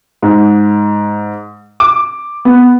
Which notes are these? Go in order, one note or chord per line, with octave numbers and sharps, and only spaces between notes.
G#2
D6
B3